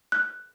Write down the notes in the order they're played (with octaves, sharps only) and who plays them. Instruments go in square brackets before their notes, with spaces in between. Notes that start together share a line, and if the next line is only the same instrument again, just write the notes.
[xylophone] F#6